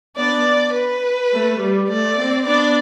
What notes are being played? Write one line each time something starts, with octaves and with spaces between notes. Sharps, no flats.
B3 D4 D5
B4
A3
G3
A3 D5
C4
B3 D4 D5